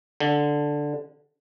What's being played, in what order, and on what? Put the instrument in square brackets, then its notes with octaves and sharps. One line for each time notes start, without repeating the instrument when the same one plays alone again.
[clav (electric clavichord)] D3